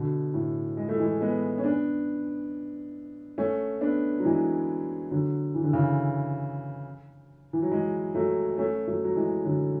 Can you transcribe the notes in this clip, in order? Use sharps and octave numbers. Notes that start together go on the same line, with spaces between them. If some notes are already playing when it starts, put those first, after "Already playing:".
Already playing: B2 D3
A2
G#3
A3
E3 G#3
G#3 B3
C#4
B3 D4
A3 C#4
B3 D4
F#3
E3 G#3
D3 F#3
E3
D3
C#3 E3
E3
F#3
E3 G#3
F#3 A3
A3 C#4
F#3 A3
F#3
E3 G#3
D3 F#3